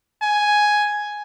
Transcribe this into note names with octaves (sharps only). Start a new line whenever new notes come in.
G#5